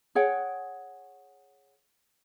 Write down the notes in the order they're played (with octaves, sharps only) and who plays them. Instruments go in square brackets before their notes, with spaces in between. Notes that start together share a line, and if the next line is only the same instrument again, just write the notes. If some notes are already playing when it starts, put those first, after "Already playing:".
[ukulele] G#4 C#5 F#5 G5